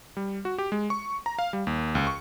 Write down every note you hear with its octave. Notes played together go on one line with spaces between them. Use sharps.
G3
F#4
G4
G#3
C#6
A#5
F5
G3
D#2
C#2
C#6